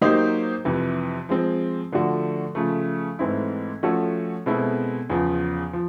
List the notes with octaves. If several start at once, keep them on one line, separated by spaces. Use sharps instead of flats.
F#3 A#3 D#4 G4 C5
F2 C3 E3
F3 G#3 C4
D3 F3 A3 D4 F#4
C#3 F3 A3
G#2 E3 A3 C4 E4
F3 A3 C#4 F#4 A4
B2 G#3 C4 E4 A4
E2 C#3 F3
F3